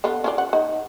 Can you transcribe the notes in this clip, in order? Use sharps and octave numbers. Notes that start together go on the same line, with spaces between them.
D3 B3 F4
C#4 F4 D5
F#5
D#4